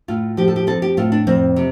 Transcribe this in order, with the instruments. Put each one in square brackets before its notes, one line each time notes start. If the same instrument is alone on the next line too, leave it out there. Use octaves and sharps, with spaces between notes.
[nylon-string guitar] A2 F4
F3 G4
A4
G4
C4 A4
G4
A2 F4
D4
F2 C4
C3